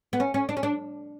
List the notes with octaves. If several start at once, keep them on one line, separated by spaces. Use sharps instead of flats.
B3
C#4
C#4
D4
C#4
D4